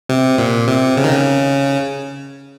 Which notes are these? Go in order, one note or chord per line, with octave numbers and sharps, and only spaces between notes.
C3
A#2
C3
C#3
D#3
C#3